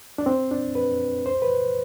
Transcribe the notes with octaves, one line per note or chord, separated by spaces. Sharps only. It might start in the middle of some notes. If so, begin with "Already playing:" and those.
D4
C4
D4
B4
C5
B4